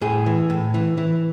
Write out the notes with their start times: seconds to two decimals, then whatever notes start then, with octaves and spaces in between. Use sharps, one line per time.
0.01 A2 G#4
0.26 E3
0.50 A2
0.74 E3
0.98 E3